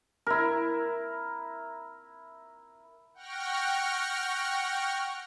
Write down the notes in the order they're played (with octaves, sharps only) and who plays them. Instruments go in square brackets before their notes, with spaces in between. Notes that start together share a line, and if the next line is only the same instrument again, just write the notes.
[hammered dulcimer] E4 A#4
[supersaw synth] F#5 G5 C#6 F6 A#6